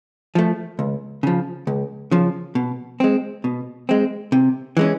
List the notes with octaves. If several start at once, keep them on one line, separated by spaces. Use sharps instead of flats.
F3 A3
C#2
C#3 F3
C#2
C#3 F3
B2
G#3 C4
B2
G#3 C4
C3
E3 G#3 C#4